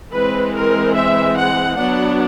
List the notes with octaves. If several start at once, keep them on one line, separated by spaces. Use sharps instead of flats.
E3 G#3 C4 B4
A#4
E5
F#5
F#3 B3 D4 F#5